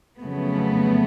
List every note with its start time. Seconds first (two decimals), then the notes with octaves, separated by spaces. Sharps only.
0.20 F2 C#3 F#3 A3 B3